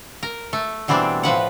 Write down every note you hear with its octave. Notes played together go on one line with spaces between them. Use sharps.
A#4
A3
B2 E3 G3 C4 D4
A2 F3 B4 F#5